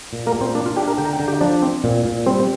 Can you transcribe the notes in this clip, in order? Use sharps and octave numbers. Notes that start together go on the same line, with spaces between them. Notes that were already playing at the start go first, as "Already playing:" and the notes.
A#2
A#3 A#4
A#2
C4 C5
A#3 D4 D5
F4 F5
D4 G4 G5
A#4 A#5
D3 G5
A#5
G5
D3 A#5
G4 G5
F3 D4 D5
C4
A#2
A#2
G3 C4 C5